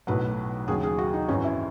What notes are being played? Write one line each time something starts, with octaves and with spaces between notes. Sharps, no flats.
B1 A2 F#3 B4
D#2 C#3 F#3 G#4
G#4
F#4
D#4
G#1 F#2 E3 C#4
E4